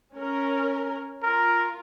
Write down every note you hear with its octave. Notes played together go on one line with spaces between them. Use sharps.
C#4 A#4
F4 A#4